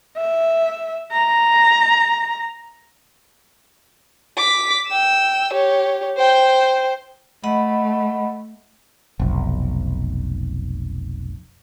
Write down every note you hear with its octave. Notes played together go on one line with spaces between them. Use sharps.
E5
A#5
D6 B6
G5 E6
G4 C#5
C5 G5
A3 D#5 F#5 B5
F1 B1